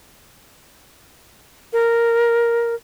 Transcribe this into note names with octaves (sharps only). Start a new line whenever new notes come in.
A#4